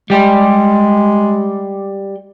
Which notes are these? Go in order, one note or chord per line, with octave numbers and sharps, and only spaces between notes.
G3 G#3 G4